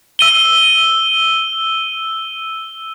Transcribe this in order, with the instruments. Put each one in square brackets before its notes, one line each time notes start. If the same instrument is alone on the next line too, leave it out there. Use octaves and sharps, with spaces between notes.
[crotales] E6 D#7 G7